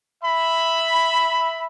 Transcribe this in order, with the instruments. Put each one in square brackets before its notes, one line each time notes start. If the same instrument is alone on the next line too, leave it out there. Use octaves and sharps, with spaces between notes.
[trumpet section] E5 B5